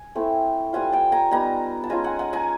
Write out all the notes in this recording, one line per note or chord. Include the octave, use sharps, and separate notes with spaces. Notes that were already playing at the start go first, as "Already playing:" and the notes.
Already playing: G#5
A3 C4 E4
G3 C4 F4 F#5 G#5
G5 A5
G#5 A#5
G3 B3 D#4 G#5 A#5
A5
G#3 C#4 F4 G#5 A#5
F#5 G#5
F#5 G#5
G#5 A#5